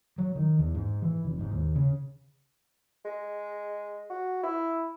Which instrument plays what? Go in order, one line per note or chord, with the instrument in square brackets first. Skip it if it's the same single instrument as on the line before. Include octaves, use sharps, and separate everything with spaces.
[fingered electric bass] F#3
D#3
E2
G#2
E3
F1
G#2
D#2
C#3
[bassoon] G#3
F#4
E4